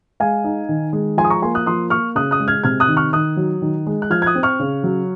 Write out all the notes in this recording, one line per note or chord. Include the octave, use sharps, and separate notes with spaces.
G#3 F5 G#5
D#4
D#3
G#3
F3 G#5 C6
D#6
A#5 C#6
A#3 G#5 C6
D#6 F#6
F3 C6 D#6
A#3 C#6 F6
C#3 D#6 F#6
D#6 F#6
G#3
F6 G#6
C3 F6 G#6
D#6 F#6
D#3
C#6 F6
D#3 D#6 F#6
F#3
D#3
G#3
F#6
F3 F6 G#6
G#6
D#6 F#6
C4
C#6 F6
C#3
F#3